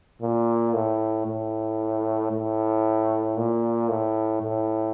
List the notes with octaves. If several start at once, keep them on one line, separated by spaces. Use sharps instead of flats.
A#2
A2
A2
A2
A#2
A2
A2